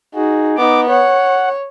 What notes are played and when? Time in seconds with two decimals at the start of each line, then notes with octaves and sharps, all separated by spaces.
0.15 D#4 F#4 G#4
0.57 B3 D#4 D6
0.90 C#5 F#5